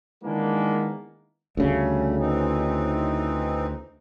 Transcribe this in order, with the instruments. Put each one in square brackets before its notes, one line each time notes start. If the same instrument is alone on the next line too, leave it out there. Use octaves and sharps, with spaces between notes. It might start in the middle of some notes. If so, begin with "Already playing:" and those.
[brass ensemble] D#3 E3 G#3 A#3 B3 D4
[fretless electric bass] D2 C#3 [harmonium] G3 A3
[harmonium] E3 C4 D#4